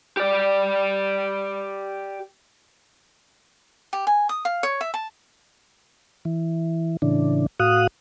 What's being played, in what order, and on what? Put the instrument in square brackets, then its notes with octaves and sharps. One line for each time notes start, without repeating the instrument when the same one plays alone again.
[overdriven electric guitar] G4 D5
[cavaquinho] G4
G#5
D#6
F5
C#5
E5
A5
[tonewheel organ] E3
A2 C#3 E3 D4
A2 F#4 F5 D#6 F#6